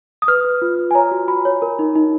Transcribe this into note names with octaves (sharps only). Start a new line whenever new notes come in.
D#6
B4 F6
B4
F4
F4
G#5
C#5 A#5
F#4
F#4 B5
C#5
A#4
D#4
D#4